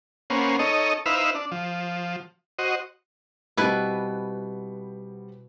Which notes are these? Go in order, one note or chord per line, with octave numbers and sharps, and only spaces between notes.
A#3 B3 C#4 C5
D#4 A4 C#5 D#5
D#4 E4 B4 C5 E5 F5
D4
F3
F#4 C5 D#5
B2 G3 B3 C4 E4 B4